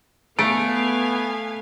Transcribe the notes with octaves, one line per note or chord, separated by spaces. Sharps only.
A3 B3 F5 G#5 D7